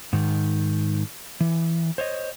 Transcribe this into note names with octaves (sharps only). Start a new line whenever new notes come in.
G#2 D#3
E3
C5 C#5 D#5